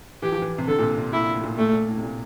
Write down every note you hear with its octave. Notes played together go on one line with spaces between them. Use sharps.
E3 G4
F3
E3
C3
D3 A4
A#2
C3
C3
A#2 E4
A2
A#2
A#2 A3
A#2
A2
C3
A#2